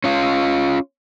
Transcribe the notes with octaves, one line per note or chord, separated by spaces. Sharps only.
C#4 F4